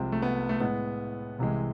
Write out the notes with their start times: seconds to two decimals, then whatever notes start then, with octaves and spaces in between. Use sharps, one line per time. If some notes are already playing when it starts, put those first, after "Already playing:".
Already playing: C2 C3 F3 G#3 C4
0.12 A3
0.22 B3
0.49 A3
0.60 A2 G#3 B3
1.39 C2 C3 E3 G#3